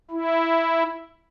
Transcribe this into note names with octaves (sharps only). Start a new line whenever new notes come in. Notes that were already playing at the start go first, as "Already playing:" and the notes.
E4